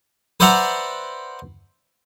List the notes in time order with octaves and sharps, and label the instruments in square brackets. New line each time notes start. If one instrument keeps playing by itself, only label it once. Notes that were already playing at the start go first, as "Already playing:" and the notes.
[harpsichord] B4 C5 D5 E5 F#5 A#5